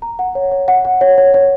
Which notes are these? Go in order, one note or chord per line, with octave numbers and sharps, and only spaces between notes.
A#5
F#5
C#5
C#5
F#5
F#5
C#5
C#5
C#5